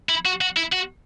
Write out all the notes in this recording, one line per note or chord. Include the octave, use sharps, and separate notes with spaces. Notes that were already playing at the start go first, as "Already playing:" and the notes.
E4
F#4
F#4
E4
F#4